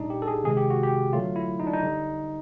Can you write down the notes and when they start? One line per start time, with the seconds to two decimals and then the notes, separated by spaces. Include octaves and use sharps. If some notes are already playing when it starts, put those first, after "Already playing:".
Already playing: A#2 G3 D4 D#4
0.10 G4
0.22 A4
0.28 G#4
0.44 C3 D#3 G#3 G#4
0.57 G4
0.70 F#4
0.83 G4
1.13 D3 F#3 A3 F4
1.36 E4
1.60 D#4
1.67 D4
1.73 D#4
1.83 D3 G3